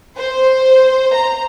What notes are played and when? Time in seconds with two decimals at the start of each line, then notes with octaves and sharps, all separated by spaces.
0.16 C5
1.13 A#5